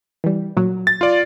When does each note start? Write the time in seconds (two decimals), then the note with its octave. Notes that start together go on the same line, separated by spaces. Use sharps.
0.24 E3 G3
0.57 A#2 F#3
0.87 A6
1.01 F4 D5